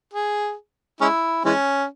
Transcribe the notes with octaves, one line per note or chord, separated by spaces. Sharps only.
G#4
G#3 C#4 E4
E3 G#3 C#4